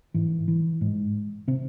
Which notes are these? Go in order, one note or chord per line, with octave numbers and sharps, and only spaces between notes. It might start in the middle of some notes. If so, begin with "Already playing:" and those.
G#2 E3
E3
G#2 G#3
C3 C4